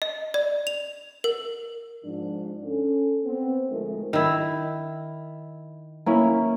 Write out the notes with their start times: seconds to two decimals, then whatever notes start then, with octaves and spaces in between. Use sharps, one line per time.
0.02 D#5
0.34 D5
0.67 F7
1.24 A#4
2.04 G#2 F3 D4
2.65 C#4 A4
3.25 B3 C4
3.69 D2 F3 G#3 A3 D#4 A#4
4.13 D#3 E4
6.06 A#3 C#4 E4